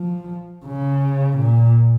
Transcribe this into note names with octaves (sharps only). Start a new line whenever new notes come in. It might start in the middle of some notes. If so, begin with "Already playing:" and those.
Already playing: F3
C#3
A#2